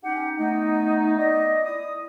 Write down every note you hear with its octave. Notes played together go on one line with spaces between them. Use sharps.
C#4 D#4 G4 F#5
A3 B3 D#4
D5 D#5
E4 D#6